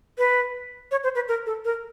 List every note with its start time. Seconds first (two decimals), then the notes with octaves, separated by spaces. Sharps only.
0.18 B4
0.91 C#5
1.03 C5
1.15 B4
1.28 A#4
1.46 A4
1.65 A#4